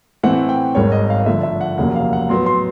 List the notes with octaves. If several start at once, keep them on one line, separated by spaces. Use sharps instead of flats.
A2 E3 A3 C4 E4 F#5
G5
G#1 G2 D#3 G#3 C#5
D#5
F5
G2 D3 F3 A3 E5
E5
F#5
F1 D#2 C#3 F#3 A#3 F#5
F5
F#5
A2 F#3 B3 C6
C6